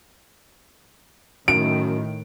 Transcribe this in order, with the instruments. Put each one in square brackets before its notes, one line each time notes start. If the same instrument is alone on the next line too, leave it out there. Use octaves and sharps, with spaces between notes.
[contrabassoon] F#2 [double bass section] A2 D#3 [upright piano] D7